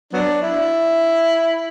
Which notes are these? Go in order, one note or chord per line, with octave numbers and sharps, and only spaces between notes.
F#3 B3 D4
E4